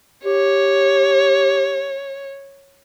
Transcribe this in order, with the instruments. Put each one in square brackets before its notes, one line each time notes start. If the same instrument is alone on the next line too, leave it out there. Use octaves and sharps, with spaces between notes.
[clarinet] G4 [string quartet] C#5